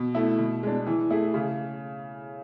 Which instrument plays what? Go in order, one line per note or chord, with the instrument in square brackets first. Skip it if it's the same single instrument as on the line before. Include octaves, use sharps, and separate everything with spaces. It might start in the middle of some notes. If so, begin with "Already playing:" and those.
Already playing: [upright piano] B2
A3 E4
B2
G#3 D4
E3
A3 E4 G#4
C#3